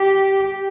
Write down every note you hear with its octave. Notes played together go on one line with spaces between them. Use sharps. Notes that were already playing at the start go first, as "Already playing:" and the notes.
Already playing: G4